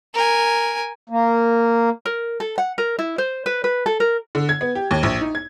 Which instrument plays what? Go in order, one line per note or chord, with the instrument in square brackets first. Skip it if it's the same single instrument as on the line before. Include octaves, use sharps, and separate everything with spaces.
[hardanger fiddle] A#4 G#5
[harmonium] A#3
[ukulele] A#4
A4
F#5
A#4
E4
C5
B4
B4
A4
A#4
[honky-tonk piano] D3
G#6
B3
G4
D#2
A#1
D#4
G#6